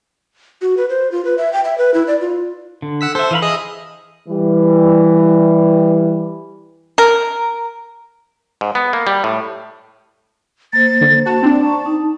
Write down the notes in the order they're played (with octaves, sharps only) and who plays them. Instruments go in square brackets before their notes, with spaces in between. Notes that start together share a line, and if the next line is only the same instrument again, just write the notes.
[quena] F#4
B4
C5
F4
B4
E5
G5
E5
B4
E4
D5
F4
[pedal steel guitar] D3
[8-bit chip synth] F#5 E6 B6
[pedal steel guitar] A4 E5 [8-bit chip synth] C5
[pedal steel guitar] E3 F5 B5
[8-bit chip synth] G#4 D#5 D#6 [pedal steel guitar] E5
[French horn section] E3 G3
[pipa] A#4
[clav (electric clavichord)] G#2
B3
A#3
G3
A2
[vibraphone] A#3 C5 [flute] A6
[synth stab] D3
[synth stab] F#4 [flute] A5
[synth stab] C4 D4
[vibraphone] D5 A#5 C#6
D#4